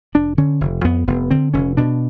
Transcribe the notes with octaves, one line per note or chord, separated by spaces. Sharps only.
F1 D4
D3 C#4
F1
F2 B3
F1 B3
D3 C4
F1 C#4
B2 D4